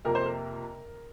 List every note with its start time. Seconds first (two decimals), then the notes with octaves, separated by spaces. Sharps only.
0.05 F2 C3 F3 A#3 A#4
0.15 C5
0.26 A#4